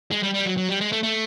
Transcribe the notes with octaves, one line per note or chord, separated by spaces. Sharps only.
G#3
G3
G3
F#3
F#3
G3
G#3
A3
A3